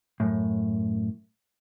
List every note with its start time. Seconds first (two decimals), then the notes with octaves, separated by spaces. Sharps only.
0.20 F#2 A2